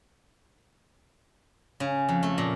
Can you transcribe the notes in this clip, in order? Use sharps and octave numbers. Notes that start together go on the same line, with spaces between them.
C#3
F2
A3
A#2